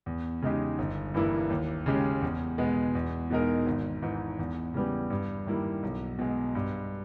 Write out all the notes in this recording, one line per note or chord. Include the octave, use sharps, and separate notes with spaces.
E2
C#3 G#3 D#4 G4
G1
G2 E3 A#3 E4
D#2
C#3 G#3 C#4 G4
E2
B2 G#3 B3
E2
B2 G#3 D#4 A#4
G#1
G#2 E3
E2
C#3 E3 G3 B3
G2
D#3 G3 A#3 E4
B1
B2 G#3
G2